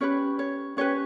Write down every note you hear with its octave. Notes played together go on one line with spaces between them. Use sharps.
C#4 G4 B4 C#5
C#5
C#4 G4 B4 C#5